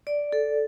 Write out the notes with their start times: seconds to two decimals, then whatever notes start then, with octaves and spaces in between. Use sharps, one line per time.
0.07 D5
0.32 A4